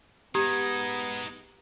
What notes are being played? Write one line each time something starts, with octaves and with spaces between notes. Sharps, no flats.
G#3 B3 D#4 G4 A#5 D#6 G#6